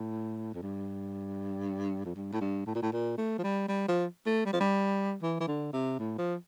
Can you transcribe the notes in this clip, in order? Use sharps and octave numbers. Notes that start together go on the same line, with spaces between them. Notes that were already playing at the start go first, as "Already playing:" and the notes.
Already playing: A2
F2
G2
F2
G2
A2
G2
A2
A#2
A2
A#2
A3
F3
G3
G3
F3
A3
G3
F3
G3
E3
E3
D3
C3
A2
F3